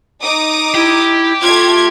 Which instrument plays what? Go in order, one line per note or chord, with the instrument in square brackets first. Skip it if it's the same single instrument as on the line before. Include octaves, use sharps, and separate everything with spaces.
[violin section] D#4 D6 D#6
[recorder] E4 [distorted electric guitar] G4
[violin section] A3 G#6 [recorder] F4